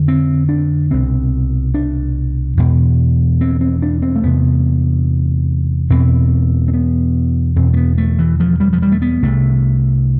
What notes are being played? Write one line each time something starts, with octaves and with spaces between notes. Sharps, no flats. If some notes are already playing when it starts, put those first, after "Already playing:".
Already playing: F2 D3
C4
D4
C2 B2 C4
D4
E2 B2
C4
C4
D4
C4
A3
E2 C3 B3
E2 B2 C4
C4
B3
E2 B2 C4
A3
B3
A3
E3
F3
G3
F3
G3
A3
B3
C2 C3 A3